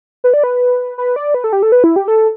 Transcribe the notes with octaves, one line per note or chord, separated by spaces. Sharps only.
B4
D5
B4
B4
D5
B4
A4
G4
A4
B4
E4
G4
A4